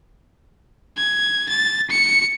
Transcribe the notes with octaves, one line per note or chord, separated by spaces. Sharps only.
G#6
A6
C#7